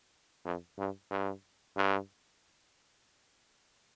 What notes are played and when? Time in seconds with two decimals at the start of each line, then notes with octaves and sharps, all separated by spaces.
0.45 F2
0.78 G2
1.10 G2
1.76 G2